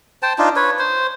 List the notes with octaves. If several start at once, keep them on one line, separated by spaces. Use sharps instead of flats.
C5 G5 A5
D4 D#4 F4
B4 C#5
C5